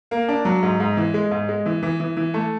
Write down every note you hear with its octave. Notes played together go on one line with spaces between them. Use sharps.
A#3
D4
F#3
G#2
G#2
E3
G#3
G#2
G#3
E3
E3
E3
E3
A3